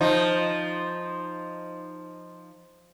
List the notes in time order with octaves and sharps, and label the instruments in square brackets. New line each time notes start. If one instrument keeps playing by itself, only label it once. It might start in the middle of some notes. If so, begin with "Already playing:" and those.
[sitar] F3 D#4